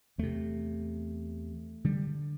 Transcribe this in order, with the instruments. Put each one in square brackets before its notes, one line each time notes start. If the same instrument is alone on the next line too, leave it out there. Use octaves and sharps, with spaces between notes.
[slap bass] E2 C3 A3
D3 G3